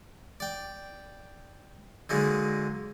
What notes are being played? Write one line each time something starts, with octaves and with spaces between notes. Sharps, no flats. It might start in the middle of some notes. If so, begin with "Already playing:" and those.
D5 G5
D3 D#3 F#3 G#3 A#3